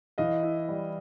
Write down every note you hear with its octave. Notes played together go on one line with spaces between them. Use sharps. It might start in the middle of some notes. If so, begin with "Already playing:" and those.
E3 D#5 F5
E4
G3